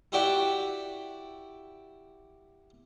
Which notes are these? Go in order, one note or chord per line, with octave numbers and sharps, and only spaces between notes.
E4 F#4 G4 D5 E5 F#5